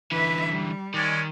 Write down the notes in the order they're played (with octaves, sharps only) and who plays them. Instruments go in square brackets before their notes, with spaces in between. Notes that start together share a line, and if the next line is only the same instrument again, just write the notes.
[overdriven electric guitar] D3 E3 [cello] B4 E5
[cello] G3
[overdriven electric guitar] D#3 [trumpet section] G#3 C#4 D5